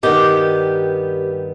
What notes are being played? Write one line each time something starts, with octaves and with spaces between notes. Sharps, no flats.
G2 D#3 G3 B3 G4